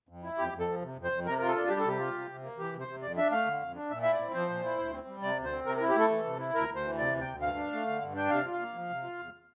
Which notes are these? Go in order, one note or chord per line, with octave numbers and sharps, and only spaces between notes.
F2
E4
F2 G4
F2
A4
F3
C3
F2
C5
F2
C3 A#4
F4 A#4
A4
D4
G3 G4
A4
C3 G4
F4
C3
C3
A#3
E3 G4
C3
C5
C3
F2 D5
D4 E5
A3 F5
D3
F2
D4
A#2 E5
E4 E5
D5
C4
F3 C5
A#2
E4
D2
C4
G3
C3 D5
D2
C5
C4
C3 A#4
A#4
E4
G4
A3 A4
E3
C3
E4
D2 A#4
D2
C5
E3
C3 D5
D2
G5
D2
G2 F5
D4
A3
D3
G2
D4 G5
C3 F5
F4
F5
A#3
F3
C3
F4
E2